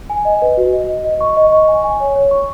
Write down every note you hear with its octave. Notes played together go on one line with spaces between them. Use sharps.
G#5
D#5
B4
F#4
D#5
D#5
D#5
C#6
D#5
C#6
G#5
G#5
C#5
C#5
C#6